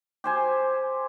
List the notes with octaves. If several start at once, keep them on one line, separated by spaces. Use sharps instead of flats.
G4 C5 G#5